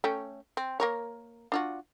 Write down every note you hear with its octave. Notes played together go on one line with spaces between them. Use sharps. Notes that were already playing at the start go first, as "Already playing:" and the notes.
A3 C#4 G5
C4
A#3 A#4 C#5
D4 F4 F#4